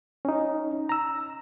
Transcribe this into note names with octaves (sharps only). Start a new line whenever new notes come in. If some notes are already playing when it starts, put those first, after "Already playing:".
C#4 D#4
A#5 E6